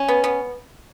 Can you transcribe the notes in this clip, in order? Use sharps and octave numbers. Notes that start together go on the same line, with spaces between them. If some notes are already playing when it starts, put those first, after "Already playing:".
Already playing: C#4
B3
B3